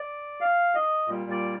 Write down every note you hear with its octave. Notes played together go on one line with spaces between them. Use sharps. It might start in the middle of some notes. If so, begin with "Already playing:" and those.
Already playing: D5
F5
D#5
A#2 G3
D5